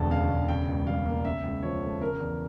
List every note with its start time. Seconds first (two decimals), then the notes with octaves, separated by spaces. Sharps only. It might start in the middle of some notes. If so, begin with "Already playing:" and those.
Already playing: E1 D2 A5
0.10 C#3 F5
0.30 E1
0.48 C#3 G5
0.68 C#2
0.87 G3 F5
1.06 A#3
1.25 C#3 E5
1.43 C#2
1.62 F3 C#5
1.82 A3
2.01 C#3 A#4
2.20 E2